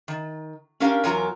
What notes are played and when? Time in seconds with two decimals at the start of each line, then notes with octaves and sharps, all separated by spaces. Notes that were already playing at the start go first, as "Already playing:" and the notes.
0.08 D#3
0.80 C#4 D4 G4 A#4 F5
1.04 E2 F#3 F4 A#4 G#5 A#5